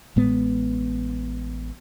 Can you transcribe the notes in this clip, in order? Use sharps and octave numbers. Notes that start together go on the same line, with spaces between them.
A1 A2 G#3 B3